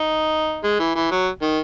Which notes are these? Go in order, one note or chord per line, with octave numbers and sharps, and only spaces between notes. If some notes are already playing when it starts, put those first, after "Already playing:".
Already playing: D#4
G#3
E3
E3
F#3
D#3